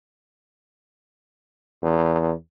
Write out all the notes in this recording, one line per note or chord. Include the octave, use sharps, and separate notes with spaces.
E2